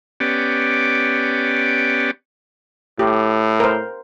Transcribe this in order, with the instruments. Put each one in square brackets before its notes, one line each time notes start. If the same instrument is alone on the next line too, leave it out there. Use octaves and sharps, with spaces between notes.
[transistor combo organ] B3 C#4 G4 D5
[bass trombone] A2 [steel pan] G4
[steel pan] A#4 C5